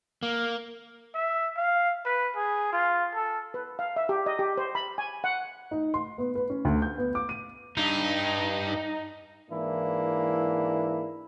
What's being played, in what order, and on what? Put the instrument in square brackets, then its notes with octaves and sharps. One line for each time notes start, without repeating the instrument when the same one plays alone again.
[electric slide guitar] A#3
[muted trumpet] E5
F5
B4
G#4
F4
A4
[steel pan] B4
F5
E5
G4
D#5
G4
C5
B5
G#5
F#5
[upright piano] D#4
C6
B3
B4
C#4
D2
G6
B3
D6
D#7
[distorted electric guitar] G2 [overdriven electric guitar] D#4
[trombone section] G#2 E3 A#3 D4 E4